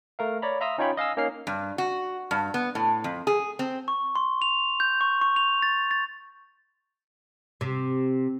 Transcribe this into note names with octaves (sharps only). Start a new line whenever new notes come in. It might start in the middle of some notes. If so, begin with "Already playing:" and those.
A3 A#4 F5
C#5 D5 A#5 B5
E5 F5 A#5 C6 D#6 E6
C#4 D#4 F4 C#5 G5 B5
D#5 F5 G#5 E6
A#3 C#4 D#4 F6 C7
G2
F#4
G2
B3
A2
F2
G#4
C4
C#6
C6
F7
G6
C#6
C#6
F7
A6
A6
C3